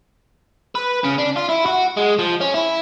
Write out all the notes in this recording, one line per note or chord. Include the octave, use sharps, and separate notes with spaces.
B4
C#3
D4
F4
E4
F#4
G#3
F3
C#4
E4